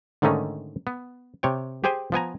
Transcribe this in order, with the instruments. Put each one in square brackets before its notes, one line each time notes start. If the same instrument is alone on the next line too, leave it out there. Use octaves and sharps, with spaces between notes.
[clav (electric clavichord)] G#2 D3 D#3 A3 C#4 D#4
B3
C3 C#5 G5
G4 G#4 C5 G5 G#5
F3 B3 G#5 A#5